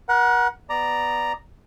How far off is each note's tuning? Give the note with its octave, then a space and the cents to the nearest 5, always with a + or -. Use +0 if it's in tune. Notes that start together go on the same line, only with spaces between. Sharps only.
A#4 +40 F#5 +0
B3 +0 D5 +5 A#5 +0